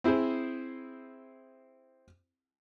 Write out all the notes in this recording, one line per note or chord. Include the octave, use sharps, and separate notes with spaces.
C4 E4 G#4 C5